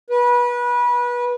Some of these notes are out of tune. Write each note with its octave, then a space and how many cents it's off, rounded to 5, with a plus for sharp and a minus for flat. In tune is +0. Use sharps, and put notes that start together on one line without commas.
B4 -25